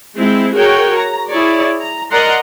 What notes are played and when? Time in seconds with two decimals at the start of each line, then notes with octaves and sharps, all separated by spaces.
0.15 G#3 C4 E4
0.55 F#4 G#4 A#4 C#5 G5
0.97 A#5
1.29 E4 G#4 C#5 D5
1.81 A#5
2.11 A#4 D5 D#5 F#5 A#5 C6